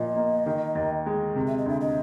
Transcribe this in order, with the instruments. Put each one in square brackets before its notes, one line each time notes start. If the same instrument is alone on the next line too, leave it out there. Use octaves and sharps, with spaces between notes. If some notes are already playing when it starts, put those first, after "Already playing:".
Already playing: [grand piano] A#2 F3 [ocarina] D#5
[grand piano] A#3
D#3
D#2
G#3
C3
[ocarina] E5
D#5
[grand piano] D2 [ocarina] E5
[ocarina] D#5